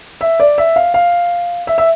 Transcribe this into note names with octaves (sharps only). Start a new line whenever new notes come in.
E5
D5
E5
F5
F5
E5
E5